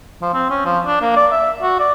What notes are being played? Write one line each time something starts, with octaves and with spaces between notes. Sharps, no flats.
F3
C4
C#4
F3
D4
A#3
D5
E5
F#4
D5